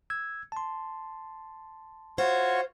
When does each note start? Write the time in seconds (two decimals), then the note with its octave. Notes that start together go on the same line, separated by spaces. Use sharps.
0.10 E6 G#6
0.52 A5 C6
2.18 F4 F#4 C5 C#5